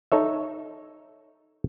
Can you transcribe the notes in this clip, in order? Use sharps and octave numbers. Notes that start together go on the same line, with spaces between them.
D#4 A4 C#5 E5